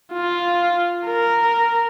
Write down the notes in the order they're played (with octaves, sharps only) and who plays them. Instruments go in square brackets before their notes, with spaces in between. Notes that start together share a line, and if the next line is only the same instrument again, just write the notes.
[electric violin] F4
A#4